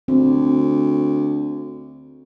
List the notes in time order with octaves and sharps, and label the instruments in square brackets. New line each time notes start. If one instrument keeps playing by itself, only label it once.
[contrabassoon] D2 [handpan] C4